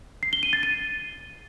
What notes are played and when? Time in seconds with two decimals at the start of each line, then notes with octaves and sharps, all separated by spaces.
0.23 C7
0.33 G7
0.43 D#7
0.53 A6
0.63 D#7